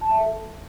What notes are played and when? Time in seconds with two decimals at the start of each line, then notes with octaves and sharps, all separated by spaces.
0.01 A5
0.11 E5
0.20 A4